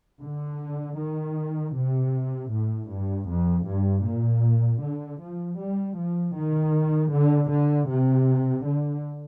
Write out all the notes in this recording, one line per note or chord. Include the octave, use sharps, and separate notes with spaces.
D3
D#3
C3
A2
G2
F2
G2
A#2
D3
F3
G3
F3
D#3
D3
D3
C3
D3